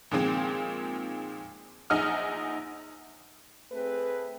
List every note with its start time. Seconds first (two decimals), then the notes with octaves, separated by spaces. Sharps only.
0.11 A#2 D#3 F3 G#3 C4
1.90 A#1 D#4 G#4 F#5 D#6 F6
3.72 A3 C4 G#4 B4